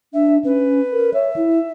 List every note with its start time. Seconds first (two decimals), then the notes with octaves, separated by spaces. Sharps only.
0.14 D4 E5
0.45 C#4 B4
0.93 A#4
1.14 C#5 E5
1.36 E4